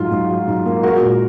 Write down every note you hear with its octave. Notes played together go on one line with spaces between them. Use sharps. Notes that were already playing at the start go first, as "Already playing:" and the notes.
Already playing: G#2 F#3 G#3 F4
G#2
F#3
G#2
A#3
G#3 F#4 A#4
A#2